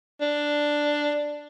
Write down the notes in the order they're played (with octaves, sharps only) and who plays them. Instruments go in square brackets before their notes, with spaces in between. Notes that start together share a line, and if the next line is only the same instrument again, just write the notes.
[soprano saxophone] D4